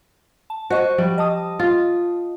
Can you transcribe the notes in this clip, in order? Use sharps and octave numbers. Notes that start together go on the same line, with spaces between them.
A5
F#4 C5 D#5 C#6
F3 G3
D#5 A5 D#6
F4